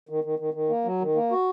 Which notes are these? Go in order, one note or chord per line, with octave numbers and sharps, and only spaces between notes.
D#3
D#3
D#3
D#3
A#3
F#3
D#3
A#3
F#4